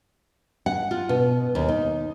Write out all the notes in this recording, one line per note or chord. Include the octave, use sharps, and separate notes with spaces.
F#5
F4
B2
D#2
D#4